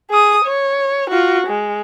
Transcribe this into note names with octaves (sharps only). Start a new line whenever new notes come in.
G#4 D#6
C#5
F4 F#4
G#3